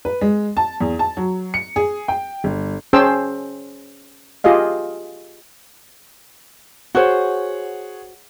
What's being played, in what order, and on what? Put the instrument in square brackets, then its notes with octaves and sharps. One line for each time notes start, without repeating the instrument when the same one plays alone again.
[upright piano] B4
G#3
A5
E2
A5
F#3
C#7
G#4
G5
G1
[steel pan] C#4 G#4 C5 G5 A5 E6
F4 G4 G#4 D#5 F5
[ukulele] F#4 C5 [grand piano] G#4 C#5 F#5